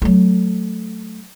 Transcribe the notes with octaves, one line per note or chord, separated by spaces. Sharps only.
F#3 A3